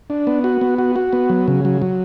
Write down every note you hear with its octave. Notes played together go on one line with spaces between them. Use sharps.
D4
B3
F#4
B3
F#4
F#4
B3
F#3
C#3
F#3
F#3